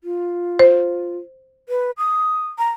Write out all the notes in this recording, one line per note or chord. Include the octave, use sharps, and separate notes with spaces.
F4
C5
B4
D#6
A#5